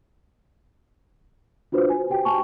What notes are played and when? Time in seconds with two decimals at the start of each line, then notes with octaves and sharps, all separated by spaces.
1.72 D4 F4 F#4 B4 C5
1.90 G#5
2.10 F#4 G4 G5
2.25 G#5 A5 C#6